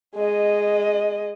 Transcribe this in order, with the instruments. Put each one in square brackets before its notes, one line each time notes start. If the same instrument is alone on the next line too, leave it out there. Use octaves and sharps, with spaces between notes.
[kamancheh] G#3 D#5